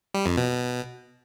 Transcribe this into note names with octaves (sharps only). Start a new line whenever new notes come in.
G3
F2
B2